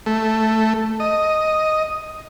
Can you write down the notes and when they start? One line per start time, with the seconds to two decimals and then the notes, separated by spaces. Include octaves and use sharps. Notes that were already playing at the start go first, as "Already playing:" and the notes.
0.06 A3
1.00 D#5